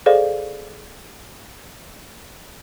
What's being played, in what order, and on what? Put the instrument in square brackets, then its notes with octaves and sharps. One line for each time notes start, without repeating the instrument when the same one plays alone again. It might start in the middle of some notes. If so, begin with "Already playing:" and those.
[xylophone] G#4 A4 C5 D5 D#5 F5